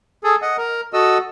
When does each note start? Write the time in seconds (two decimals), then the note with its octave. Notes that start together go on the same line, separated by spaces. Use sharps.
0.24 G#4 A4
0.42 D#5 F#5
0.58 A#4
0.93 F#4 A4 D#5 E6